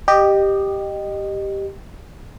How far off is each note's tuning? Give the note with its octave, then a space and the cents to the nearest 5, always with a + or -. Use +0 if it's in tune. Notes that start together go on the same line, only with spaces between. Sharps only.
G4 +0 D#5 -20